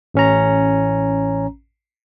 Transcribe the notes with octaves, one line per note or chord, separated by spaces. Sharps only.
A1 C#4 A#5